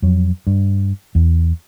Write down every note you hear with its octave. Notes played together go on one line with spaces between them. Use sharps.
F2 F#3
G2
E2